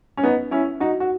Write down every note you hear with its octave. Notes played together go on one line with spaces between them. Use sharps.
C#4
B3 D#4
C#4 E4
D#4 F#4
F#4